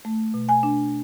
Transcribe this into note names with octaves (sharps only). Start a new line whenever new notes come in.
A3
B2
G#5
D4